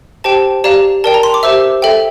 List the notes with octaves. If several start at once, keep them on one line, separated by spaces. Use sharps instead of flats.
G4 C5 G5 A5
G4 D5 F5 A#5
A#4 D5 G5 A5
A#5
C6
D6
G4 C5 E5 E6
A4 E5 G5